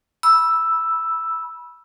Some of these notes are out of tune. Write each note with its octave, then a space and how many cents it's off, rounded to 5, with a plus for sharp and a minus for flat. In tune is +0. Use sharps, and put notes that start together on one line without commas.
B5 -20 E6 +0